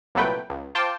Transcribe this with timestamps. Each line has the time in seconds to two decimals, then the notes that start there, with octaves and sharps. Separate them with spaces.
0.15 C2 A#2 F#3 A3 B4 G5
0.50 C#2
0.75 F4 C5 G5 A5 C6 D6